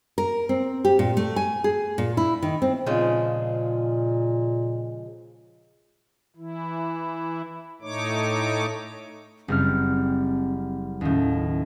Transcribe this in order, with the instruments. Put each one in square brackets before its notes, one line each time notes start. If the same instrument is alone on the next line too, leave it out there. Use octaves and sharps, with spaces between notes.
[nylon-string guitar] A#4
C4
G4
A#2
A3
G#5
G#4
A#2
E4
D#3
C4
[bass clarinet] A#2 [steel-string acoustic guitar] C#3 F3 G#3
[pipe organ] E3 E4
A2 A3 D#4 C#5 D6
[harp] F#1 G3 F6 [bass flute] C4
[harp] D#2 A2 [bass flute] C#4